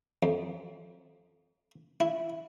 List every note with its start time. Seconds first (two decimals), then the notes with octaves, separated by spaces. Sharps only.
0.23 F2
2.00 E4